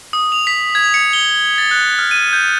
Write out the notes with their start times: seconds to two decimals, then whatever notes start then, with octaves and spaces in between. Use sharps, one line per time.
0.13 D#6
0.32 F7
0.47 B6
0.75 G#6
0.94 C#7
1.13 G7
1.58 A6
1.71 F#6
1.99 F6
2.11 D#7
2.33 G6